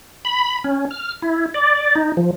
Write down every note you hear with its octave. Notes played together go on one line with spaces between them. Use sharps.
B5
C#4
F6
E4
D5
D#4
F3